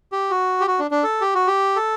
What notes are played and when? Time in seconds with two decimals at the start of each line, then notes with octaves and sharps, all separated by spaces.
0.12 G4
0.31 F#4
0.61 G4
0.67 F#4
0.79 D4
0.91 D4
1.04 A4
1.21 G4
1.35 F#4
1.47 G4
1.76 A4